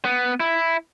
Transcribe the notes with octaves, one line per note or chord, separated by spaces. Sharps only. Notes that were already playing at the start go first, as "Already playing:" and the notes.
B3
E4